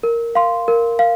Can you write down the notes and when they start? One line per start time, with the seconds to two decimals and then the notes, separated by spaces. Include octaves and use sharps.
0.03 A#4
0.35 F5 C6
0.68 A#4
0.99 F5